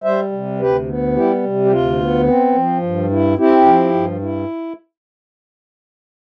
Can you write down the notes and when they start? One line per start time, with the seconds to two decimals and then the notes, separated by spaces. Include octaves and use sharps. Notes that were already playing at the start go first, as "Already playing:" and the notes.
0.04 G3 C5 E5
0.32 C3
0.60 D2 G4 B4
0.87 B3
1.16 G3 E4 G4
1.43 C3
1.65 G4
1.71 D2 F4
1.99 B3
2.27 C4
2.55 F3
2.83 G2
3.10 E4
3.38 C4 E4 G4
3.66 F3
3.94 G2
4.22 E4